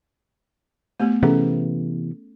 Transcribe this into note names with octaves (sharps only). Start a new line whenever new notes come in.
A3 B3 G4
C3 E3 B3 C#4 G#4 A4